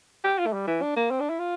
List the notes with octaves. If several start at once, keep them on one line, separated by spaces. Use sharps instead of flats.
G4
F4
A3
G3
E3
D4
A#3
C4
D4
E4
F4